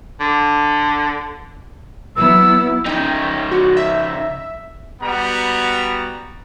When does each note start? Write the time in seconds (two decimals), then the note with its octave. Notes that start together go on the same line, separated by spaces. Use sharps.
0.21 D3
2.16 F#3 B3 E4 E6
2.86 C#3 D#4 G5
3.51 F#4
3.77 E5
5.02 G3 B3 F#4 A#5